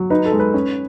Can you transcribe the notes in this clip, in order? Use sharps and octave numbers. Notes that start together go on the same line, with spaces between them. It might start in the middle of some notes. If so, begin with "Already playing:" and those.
Already playing: F#3
D#4 B4
A4
G#3
B4
C#4